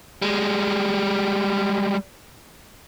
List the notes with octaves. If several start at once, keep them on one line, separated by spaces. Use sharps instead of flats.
G3 G#3